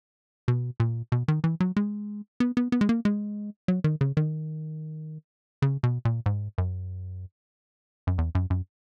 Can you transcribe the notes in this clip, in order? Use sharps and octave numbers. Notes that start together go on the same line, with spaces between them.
B2
A#2
B2
D#3
E3
F#3
G#3
B3
B3
B3
G#3
A#3
G#3
F#3
D#3
C#3
D#3
C#3
B2
A#2
G#2
F#2
F#2
E2
F#2
F#2